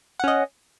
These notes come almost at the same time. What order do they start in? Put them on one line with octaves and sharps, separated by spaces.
F#5 C#4 D#5